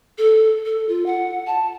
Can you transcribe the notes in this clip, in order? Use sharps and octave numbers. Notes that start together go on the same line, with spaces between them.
A4
A4
F4
F#5
A5